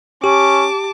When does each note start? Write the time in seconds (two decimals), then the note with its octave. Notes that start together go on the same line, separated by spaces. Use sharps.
0.24 C#4 G4 A5 D6